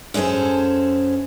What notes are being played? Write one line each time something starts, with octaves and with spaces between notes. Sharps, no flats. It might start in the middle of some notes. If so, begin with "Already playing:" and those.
F#2 C#4 G#4 A4 C5